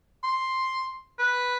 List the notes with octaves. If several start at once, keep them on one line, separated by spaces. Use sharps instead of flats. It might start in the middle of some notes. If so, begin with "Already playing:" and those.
C6
B4